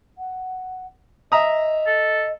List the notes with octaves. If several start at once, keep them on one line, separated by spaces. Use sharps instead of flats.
F#5
D#5 E5 A#5 D#6
A4